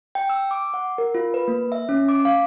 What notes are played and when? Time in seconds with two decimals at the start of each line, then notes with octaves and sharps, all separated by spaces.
0.15 G5
0.30 E6
0.51 D6
0.74 F#5
0.98 A#4
1.15 F4
1.34 B4
1.48 A#3
1.72 E5
1.89 C#4
2.09 D6
2.25 F5